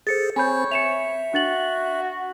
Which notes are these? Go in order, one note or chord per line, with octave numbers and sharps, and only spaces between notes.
G#4 A4 C5 A6 C#7
C4 C5 C#5 G#5 B5 G6
E5 C#7 E7 F7
D4 F#4 A6 F#7